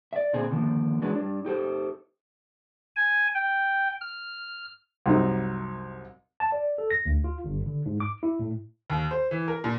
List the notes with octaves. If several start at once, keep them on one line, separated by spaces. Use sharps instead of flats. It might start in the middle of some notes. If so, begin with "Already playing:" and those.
D5 E5
A#2 D3 C4 G#4
D3 D#3 F3 G#3 A#3
E3 F#3 G#3 D4 B4
G3 D4
D#4 G4 A4 C5
G#5
G5
F6
C2 F#2 D#4
A5
D5
A4
A#6
D2
F4
G1
D3
G#2
D6
E4
A2
D#2
C5
E3
A#4
A#2